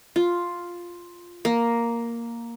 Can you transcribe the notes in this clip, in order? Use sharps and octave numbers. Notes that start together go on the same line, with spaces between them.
F4
A#3